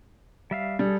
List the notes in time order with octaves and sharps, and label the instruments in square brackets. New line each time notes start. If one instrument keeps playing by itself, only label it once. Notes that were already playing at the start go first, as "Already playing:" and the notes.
[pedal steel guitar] G3 E5 F5
[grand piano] G3 [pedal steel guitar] G#4 A4